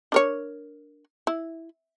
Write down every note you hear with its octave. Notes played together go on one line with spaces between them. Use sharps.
D4 A#4 C#5
E4